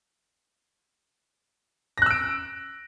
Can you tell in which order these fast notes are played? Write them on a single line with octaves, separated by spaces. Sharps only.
A#6 F#6 E6 D7